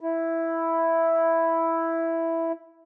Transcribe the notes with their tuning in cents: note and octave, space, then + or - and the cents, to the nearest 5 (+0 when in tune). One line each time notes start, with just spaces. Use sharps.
E4 +0